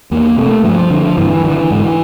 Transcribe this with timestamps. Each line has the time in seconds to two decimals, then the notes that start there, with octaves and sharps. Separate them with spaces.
0.11 E2 A#3
0.37 C3 A3
0.64 G2 F3
0.91 D3
1.17 G2 E3
1.44 D3 E3
1.71 G#2